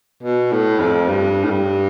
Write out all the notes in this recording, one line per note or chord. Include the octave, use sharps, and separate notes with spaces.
B2
A2
F2
G2
A2
G2